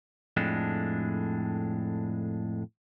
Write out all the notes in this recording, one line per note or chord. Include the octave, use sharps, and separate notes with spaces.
F2 A2 G#3 D4